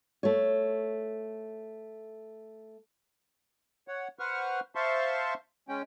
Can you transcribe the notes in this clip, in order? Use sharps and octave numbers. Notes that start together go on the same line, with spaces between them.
A3 C#5
C#5 F#5
B4 C5 F#5 C#6 F6
C5 E5 F5 A5 C6 C#6
G#3 C#4 G5